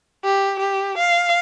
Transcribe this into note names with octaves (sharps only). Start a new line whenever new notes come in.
G4
G4
F5